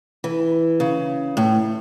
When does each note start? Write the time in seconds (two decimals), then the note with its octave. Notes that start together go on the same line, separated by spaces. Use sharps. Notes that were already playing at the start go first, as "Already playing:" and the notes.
0.24 E3
0.80 C#3
1.37 A2